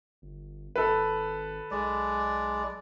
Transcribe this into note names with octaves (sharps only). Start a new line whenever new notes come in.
G1
G#1 A4 B4
B1 G#3 D5